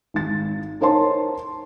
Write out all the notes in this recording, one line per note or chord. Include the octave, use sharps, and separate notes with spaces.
G#1 A6
D#4 A#4 C5 C#5 A5 C6